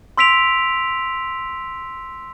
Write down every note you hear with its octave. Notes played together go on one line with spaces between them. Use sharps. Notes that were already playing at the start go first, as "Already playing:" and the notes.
C6 E6 B6 D7 F7